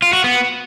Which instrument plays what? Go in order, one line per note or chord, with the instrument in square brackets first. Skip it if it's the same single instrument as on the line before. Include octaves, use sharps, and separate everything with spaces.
[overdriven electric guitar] F4
F#4
B3